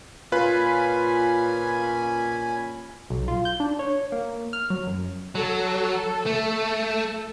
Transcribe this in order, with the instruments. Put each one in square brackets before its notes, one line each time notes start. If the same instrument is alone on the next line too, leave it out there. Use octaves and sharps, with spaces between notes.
[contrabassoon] A#2 [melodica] C#4 G#5 B5 [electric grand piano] F4 B4
[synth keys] B1
F4
G6
D4
C#5
A#3
F6
F#3
F#2
[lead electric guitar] F#3 [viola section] A4
[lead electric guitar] A3